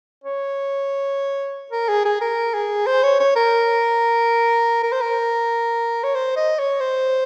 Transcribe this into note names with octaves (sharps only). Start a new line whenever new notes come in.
C#5
A#4
G#4
G#4
A#4
G#4
C5
C#5
C#5
A#4
A#4
C5
A#4
C#5
C5
D#5
C#5
C5